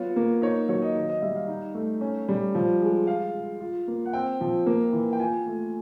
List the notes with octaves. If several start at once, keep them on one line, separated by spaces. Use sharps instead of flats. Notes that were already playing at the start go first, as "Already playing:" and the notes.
Already playing: F#3 B3 F4 C#5
A#3
D#4 C#5
F#3 C#5
D#5
D#3 D#5
D#5
G3 E5
F5
D#4
A3
C#4
G3
F3
G#3
F4 F5
G#3
F4
A#3
F#5
C4 G5
F3
A#3
E3
G5
F4 G#5
A3